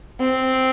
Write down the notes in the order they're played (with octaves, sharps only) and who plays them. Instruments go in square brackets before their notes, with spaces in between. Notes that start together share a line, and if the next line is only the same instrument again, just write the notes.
[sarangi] C4